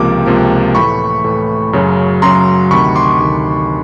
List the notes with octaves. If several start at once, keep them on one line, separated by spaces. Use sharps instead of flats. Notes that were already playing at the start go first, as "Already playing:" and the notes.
Already playing: C#2 C3 F3 A#3 D6
C#2 C3 F3 A#3
A2 E3 A3 B5 C#6
A2 E3 A3
F#2 C#3 F#3
F#2 C#3 F#3 A#5 C6
D2 C3 D#3 B5 C#6
C6 D6
D2 C3 D#3